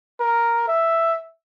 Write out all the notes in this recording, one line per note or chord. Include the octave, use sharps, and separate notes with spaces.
A#4
E5